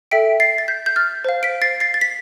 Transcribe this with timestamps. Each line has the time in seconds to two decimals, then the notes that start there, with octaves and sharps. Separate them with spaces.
0.11 A4 E5 G5 B6 D7
0.40 A6 C7
0.58 A6
0.68 G6 B6
0.86 G6
0.96 F6 A6
1.25 C5 F5
1.43 B6 D7
1.62 A6 C7
1.80 A6 C7
1.94 A6
2.01 B6